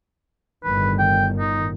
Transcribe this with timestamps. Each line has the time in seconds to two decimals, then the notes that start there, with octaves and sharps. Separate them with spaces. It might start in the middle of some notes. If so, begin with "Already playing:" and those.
0.64 G1 A2 D#3 B4
0.99 G5
1.39 D#4